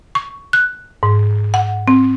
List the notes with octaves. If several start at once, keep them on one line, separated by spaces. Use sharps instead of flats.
C#6
F#6
G#2
F#5
C4